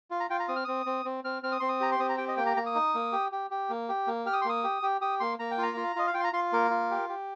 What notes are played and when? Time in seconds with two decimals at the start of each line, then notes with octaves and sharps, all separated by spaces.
0.11 F4
0.20 A#5
0.30 F4 G5
0.40 A#5
0.48 C4 D#6
0.56 F6
0.64 C4 D#6
0.86 C4
1.05 C4
1.24 C4 F6
1.43 C4 F6
1.52 D#6
1.60 C4 C6
1.69 D#6
1.80 G4 A#5
1.92 C6
1.99 C4 D#6
2.09 A#5
2.18 G4 G5
2.28 D#5
2.37 A#3 G5
2.46 A#5
2.57 A#3 A#5
2.66 D#6
2.75 D#4
2.95 A#3
3.12 G4
3.32 G4
3.51 G4
3.70 A#3
3.89 G4
4.07 A#3
4.26 G4 F6
4.33 D#6
4.42 C6
4.45 A#3 D#6
4.64 G4
4.82 G4
5.01 G4 D#6
5.20 A#3 C6
5.39 A#3 A#5
5.51 G5
5.58 F4 A#5
5.77 F4
5.96 F4 D#5
6.07 F5
6.14 F4 G5
6.20 C6
6.24 A#5
6.33 F4 C6
6.53 A#3 A#4
6.71 F4
6.91 G4
7.09 G4